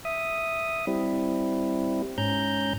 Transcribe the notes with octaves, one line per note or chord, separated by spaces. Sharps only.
E5 D#6
G3 C4 E4
G#2 C#4 A#5 G6